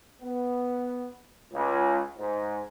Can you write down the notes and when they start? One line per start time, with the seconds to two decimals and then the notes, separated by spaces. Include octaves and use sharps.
0.22 B3
1.53 C#2
2.17 G#2